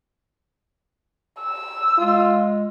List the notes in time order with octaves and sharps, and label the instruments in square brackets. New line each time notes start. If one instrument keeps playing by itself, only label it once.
[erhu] E6
[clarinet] G#3 [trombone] F4